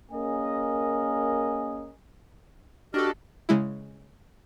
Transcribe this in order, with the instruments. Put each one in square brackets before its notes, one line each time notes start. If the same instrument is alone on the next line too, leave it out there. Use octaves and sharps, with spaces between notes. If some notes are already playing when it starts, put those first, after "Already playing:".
[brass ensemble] A#3 C#4 G#4 A#4 D#5 G#5
[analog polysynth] D4 A4 [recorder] F#4 [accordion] G4 D#5 [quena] F6
[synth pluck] C#3 G#3 E4